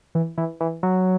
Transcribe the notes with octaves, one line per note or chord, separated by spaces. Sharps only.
E3
E3
E3
F#3